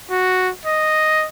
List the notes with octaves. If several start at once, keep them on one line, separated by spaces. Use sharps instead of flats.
F#4
D#5